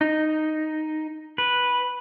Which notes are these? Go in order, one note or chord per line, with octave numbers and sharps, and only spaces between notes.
D#4
B4